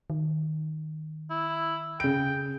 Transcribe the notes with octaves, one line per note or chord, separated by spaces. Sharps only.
D#3
E4
C#3 G5 D7